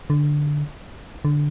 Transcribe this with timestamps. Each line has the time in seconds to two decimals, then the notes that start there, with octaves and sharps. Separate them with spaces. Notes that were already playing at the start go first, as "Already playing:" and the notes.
0.10 D3
1.25 D3